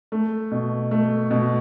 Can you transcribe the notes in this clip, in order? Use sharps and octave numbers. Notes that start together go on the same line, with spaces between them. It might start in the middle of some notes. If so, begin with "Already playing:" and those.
A3
B2
A3
B2